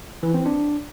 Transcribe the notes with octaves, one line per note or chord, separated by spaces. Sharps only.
E3
C4
D4